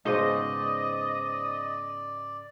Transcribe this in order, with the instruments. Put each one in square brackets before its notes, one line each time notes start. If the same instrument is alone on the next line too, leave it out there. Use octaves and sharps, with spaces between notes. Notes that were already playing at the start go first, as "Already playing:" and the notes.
[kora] G#2 C#3 B3 [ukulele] D#4 C5 [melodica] D5 [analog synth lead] D#5